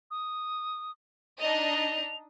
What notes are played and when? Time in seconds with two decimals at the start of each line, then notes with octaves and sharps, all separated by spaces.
0.11 D#6
1.41 D4 D#4 D#5 F7